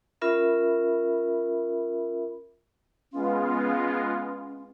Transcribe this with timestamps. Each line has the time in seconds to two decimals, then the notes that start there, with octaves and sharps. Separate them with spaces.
0.21 C#4 F4 A#4 E5 B5
3.13 G#3 B3 C#4 F4